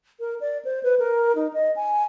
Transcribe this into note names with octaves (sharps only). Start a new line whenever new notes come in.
A#4
D5
C5
B4
A#4
D#4
D#5
G#5